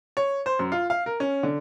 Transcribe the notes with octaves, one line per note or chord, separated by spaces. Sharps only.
C#5
C5
F#2
F4
F5
A#4
C#4
D3